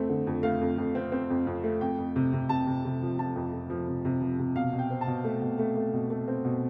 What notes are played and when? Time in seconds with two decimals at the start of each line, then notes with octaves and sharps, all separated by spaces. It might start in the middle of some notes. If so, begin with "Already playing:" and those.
Already playing: F2 A3 C4
0.09 D3
0.27 F2
0.43 A3 F5
0.61 F2
0.78 F2
0.95 C4
1.12 C4
1.30 F2
1.47 F2
1.64 A3
1.81 F2 G5
1.98 F2
2.16 C3
2.33 C3
2.49 C3 A5
2.67 C3
2.85 C3
3.02 F3
3.19 F3 A5
3.36 F2
3.53 F2
3.70 F3
3.88 C3
4.05 C3
4.22 F3
4.39 C3
4.56 B2 F5
4.73 B2
4.79 G5
4.91 C4
5.01 A5
5.07 B2
5.24 A3
5.42 B2
5.59 A3
5.76 A3
5.93 B2
6.10 A3
6.28 C4
6.45 B2